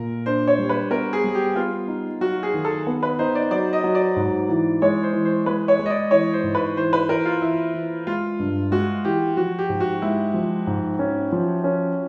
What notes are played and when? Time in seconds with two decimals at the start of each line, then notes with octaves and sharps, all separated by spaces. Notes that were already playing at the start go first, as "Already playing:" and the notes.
Already playing: A#2 A#4
0.26 D4 C5
0.47 C#5
0.58 G3
0.69 B4
0.91 B3 A#4
1.13 G#4
1.24 G3
1.35 G4
1.56 B3 F4
1.88 D#4
2.21 F#3 F#4
2.43 G#4
2.54 D#3
2.65 A4
2.87 B3
3.03 B4
3.19 D#4 C5
3.35 D5
3.51 F#3 D5
3.73 D#5
3.84 F#3
3.95 D5
4.16 G#2
4.49 E3
4.82 G#3 C#5
5.03 C5
5.14 E3
5.25 C5
5.46 G#3 B4
5.68 C#5
5.79 G#3
5.86 D#5
5.90 D5
6.11 E3 C#5
6.33 C5
6.44 G#2
6.55 B4
6.77 E3 C5
6.93 B4
7.09 E3 A#4
7.25 F4
7.42 E3 E4
7.74 E3
8.07 G#3 F4
8.39 G2
8.72 G#3 F#4
9.05 E3 G4
9.37 F3 F#4
9.59 G4
9.69 G#2
9.80 F#4
10.02 G#3 E4
10.34 F3
10.67 G#2
10.99 C#4
11.32 F3
11.64 C#4